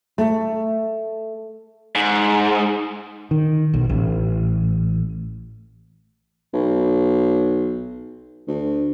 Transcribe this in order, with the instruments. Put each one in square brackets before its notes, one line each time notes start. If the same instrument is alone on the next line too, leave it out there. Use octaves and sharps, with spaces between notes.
[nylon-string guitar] A3
[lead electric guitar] G#2
[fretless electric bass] D#3
B1
A1
[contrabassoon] B1
D2